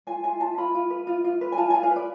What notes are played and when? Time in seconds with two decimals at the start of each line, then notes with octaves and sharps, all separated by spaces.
0.07 F4 G#5
0.24 F4 G#5
0.40 F4 A5
0.58 F4 B5
0.75 F4
0.90 B4
1.07 F4
1.24 F4
1.41 B4
1.52 G#5
1.57 F4 A5
1.70 G#5
1.74 F4
1.83 F5
1.91 B4
1.96 D5